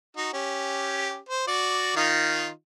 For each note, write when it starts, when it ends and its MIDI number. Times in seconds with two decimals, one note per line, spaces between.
0.17 0.32 63
0.17 0.32 66
0.33 1.17 61
0.33 1.17 67
1.29 1.47 72
1.48 1.93 66
1.48 1.93 74
1.97 2.49 51
1.97 2.49 63
1.97 2.49 65